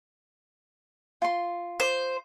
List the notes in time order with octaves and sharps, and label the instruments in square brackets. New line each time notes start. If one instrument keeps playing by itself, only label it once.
[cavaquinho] F4 C6
[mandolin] C5